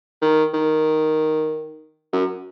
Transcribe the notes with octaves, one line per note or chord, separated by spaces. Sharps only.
D#3
D#3
F#2